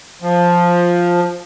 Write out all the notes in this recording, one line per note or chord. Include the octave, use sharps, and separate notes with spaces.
F3